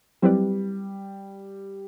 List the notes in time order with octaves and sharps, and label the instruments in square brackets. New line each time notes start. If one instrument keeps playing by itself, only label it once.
[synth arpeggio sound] F#3 C4 E4 B4 D5 [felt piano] G3